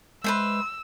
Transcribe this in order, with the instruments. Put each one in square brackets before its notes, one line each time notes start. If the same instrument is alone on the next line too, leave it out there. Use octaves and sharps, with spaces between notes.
[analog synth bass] G#3 [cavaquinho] B4 C5 E5 [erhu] E6